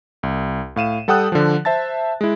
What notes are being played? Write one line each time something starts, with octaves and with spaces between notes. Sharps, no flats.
C2
A2 F5 D#7 E7
G3 A4 F#5 G5 D#6 F#6
D3 F3
C5 E5 A5 A6
G#3 E4